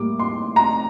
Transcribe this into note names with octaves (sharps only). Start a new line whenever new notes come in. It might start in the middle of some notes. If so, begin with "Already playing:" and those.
Already playing: A2 G3 A#3 D6
C6
A#5